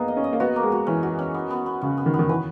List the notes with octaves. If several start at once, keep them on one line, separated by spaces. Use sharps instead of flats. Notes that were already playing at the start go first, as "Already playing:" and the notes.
Already playing: A#3 B3 D#4 G#4
D#5
C#4
D#5
A#3
B3 F#4
A#3
G#3
F#4
E3 C#4
F#4
C#4
B3
B3
B3
C#3 F#4
B3
D#3
B3
D#3
E3 B4